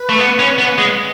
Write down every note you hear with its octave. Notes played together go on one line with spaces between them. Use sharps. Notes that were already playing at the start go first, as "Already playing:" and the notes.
Already playing: B4
A3
B3
C#4
B3
G#3